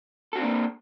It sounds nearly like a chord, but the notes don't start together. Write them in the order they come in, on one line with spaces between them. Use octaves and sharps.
A4 F#4 C4 D4 A#3